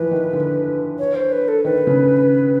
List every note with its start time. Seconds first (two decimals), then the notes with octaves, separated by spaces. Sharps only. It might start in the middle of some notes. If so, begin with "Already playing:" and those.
Already playing: E3 F3 B4
0.11 D#3
0.33 D3
0.99 C#5
1.15 C5
1.32 B4
1.48 A4
1.65 D#3 B4
1.87 C#3